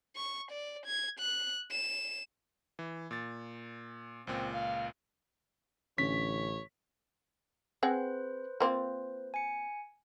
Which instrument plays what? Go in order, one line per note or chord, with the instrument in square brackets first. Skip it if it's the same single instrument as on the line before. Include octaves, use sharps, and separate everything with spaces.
[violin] C#6
D5
G#6
F#6
E7
[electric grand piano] E3
A#2 A6
[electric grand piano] C#2 A#2 [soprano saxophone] C4
[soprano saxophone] F5
[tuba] A1 [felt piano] D3 C#4 [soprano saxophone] C#5 [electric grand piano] B6
[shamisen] C4 G#4 F#5 [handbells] B4 C5
[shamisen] A#3 C4 F4
[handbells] G#5 C#7